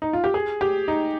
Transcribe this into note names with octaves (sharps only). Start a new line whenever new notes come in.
D#4
F4
G4
G#4
G4
D#4